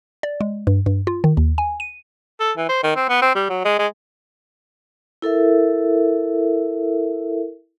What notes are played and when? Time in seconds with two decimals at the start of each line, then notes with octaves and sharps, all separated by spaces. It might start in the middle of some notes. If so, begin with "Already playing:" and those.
0.23 D5
0.41 G#3
0.67 G2
0.86 G2
1.07 F4
1.24 D#3
1.37 D#2
1.58 G#5
1.80 D#7
2.40 A4
2.57 E3
2.69 C5
2.83 D#3
2.96 C4
3.09 B3
3.22 C4
3.35 G3
3.50 F#3
3.65 G#3
3.79 G#3
5.22 E4 A4 A#4 E5